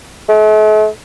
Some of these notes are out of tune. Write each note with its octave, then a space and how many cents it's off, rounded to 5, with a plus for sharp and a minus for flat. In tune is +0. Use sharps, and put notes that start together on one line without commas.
A3 -45